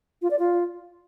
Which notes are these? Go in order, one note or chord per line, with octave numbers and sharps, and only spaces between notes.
F4
D5
F4